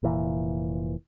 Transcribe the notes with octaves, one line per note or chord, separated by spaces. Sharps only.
F1 A#2 E3